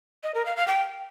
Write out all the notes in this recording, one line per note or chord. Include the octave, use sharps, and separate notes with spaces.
D#5
A#4
F5
F5
G5